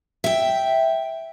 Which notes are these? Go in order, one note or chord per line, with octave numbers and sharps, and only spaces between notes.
E5 G5